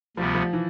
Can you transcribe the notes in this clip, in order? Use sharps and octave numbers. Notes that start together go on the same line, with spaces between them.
D2 C3 F3 G3 B3
F3
E3